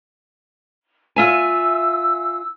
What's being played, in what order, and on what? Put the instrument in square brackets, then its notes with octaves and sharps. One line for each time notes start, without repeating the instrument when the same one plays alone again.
[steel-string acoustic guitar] F4 E5 G#5 [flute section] E6